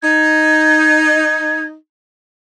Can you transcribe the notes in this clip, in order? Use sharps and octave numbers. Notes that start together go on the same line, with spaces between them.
D#4 G#6